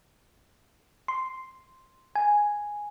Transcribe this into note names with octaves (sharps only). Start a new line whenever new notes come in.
C6
G#5